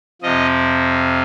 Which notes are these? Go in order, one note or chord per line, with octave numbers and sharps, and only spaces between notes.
F2 C3 F3 D#5